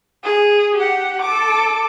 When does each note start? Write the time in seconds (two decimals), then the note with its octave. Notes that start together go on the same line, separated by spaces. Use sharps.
0.24 G#4
0.76 G4 F#5
1.22 A4 D6